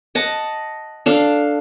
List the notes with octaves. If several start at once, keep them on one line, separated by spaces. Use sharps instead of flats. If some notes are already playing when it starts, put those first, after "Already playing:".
D#5 F#5 A5
D4 A4 F5